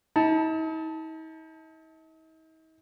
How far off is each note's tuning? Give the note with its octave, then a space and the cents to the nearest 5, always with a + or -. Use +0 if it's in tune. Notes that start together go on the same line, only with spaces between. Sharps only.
D#4 +45 A5 +0